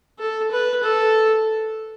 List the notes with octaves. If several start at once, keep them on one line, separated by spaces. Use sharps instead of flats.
A4
B4
A4